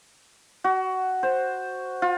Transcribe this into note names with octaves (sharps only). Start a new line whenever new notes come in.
F#4
C5
F4